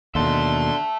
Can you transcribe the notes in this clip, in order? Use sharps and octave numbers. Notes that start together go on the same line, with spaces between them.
D#2 B2 D3 E5 A5 C6